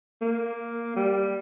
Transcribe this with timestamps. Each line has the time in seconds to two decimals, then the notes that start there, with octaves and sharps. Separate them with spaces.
0.22 A#3
0.96 G3